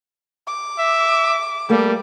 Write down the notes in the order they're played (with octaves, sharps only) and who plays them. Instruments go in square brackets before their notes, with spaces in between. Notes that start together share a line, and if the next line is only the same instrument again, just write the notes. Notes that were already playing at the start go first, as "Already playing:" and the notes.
[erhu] D6
[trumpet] E5
[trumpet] G3 [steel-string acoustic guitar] A3 A#3